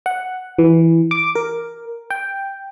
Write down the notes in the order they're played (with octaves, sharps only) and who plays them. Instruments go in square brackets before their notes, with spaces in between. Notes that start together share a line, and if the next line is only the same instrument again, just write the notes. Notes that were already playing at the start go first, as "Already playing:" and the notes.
[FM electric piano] F#5
E3
D6
A#4
G5